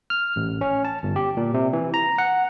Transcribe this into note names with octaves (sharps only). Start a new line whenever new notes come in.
F6
A1
C#4
A5
G1
G4
A#2
C3
E3
A#5
F#5